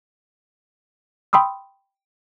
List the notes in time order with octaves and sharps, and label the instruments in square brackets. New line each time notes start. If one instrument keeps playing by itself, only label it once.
[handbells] G5 B5 C6 D#6 E6